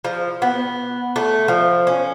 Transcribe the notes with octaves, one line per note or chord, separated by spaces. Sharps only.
F3
B3
A3
F3
C#4